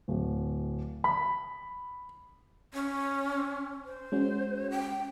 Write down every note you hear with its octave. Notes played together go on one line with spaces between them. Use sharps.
D1
B5
C#4
C5
G#3 C#4 F#4
G5